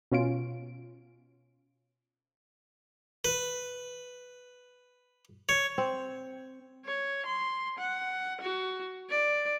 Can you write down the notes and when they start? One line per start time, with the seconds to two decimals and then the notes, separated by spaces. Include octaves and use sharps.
0.12 B2 C#4 F4 D7
3.25 B4
5.49 C#5
5.78 C4
6.85 C#5
7.26 C6
7.79 F#5
8.41 F#4
9.10 D5